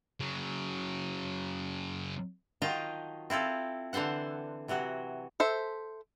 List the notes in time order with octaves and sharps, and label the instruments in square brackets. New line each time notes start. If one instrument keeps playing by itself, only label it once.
[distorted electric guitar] C#3 F#3
[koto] D#3 F#3 F4 D#5 G5 A5
C4 E4 F4 A4
D3 E3 A4 C5 F#5
C3 E3 F#3 F#4
[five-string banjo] A4 C5 E5